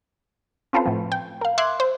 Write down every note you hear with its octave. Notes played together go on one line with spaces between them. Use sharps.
C4 C#4 F4 A4 B4 C5
A2 F3
G5
A#4 F5
E5 C6 D6 E6 F#6 G#6
C5